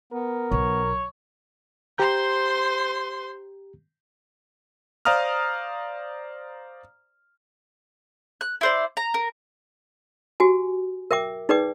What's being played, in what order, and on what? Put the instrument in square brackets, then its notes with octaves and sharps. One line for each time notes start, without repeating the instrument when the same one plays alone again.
[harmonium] B3 [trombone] A#4
[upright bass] B1 [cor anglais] C#5
[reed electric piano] G4 A#5 G6 [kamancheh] C5 C6
[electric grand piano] C5 D5 F5 A#5 D#6 F6
[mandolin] F#6
E4 C5 D5
A#5
A#4
[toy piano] F#4 G4 G#5
A#4 E5 G5 D6
D#4 G#4 B4 D5 G5 D6